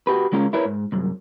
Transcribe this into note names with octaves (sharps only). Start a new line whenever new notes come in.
F#4 G4 B4
C#3 G#3 C#4 F4 A#4
E4 A#4 B4 C#5
G#2
C2 F#2